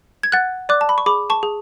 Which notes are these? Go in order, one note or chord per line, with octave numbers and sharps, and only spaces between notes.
G#6
F#5 F#6 A6
D5 D6 F#6
A5
B5
C#6
G#4 B5 D6
A5 C#6
G#4